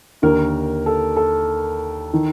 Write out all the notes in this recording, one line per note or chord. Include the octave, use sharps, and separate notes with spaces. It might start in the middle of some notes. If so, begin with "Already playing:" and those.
D#2 D3 A#4
A4
A4
D#3